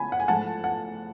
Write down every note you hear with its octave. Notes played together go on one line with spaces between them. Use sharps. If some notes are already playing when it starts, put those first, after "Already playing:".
Already playing: C#3 B3 G#5 A5 B5
F#5
G#5
G#2 F3 A3 F#5 A5
F#5